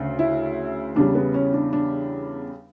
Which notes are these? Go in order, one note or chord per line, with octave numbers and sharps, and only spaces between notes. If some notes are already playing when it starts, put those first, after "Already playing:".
Already playing: D2 C#3
E4
E2 C#3 G3 D4
B3
C#4
D4
D4